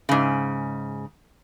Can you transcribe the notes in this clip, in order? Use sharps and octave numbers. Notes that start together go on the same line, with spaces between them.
G#2 C#3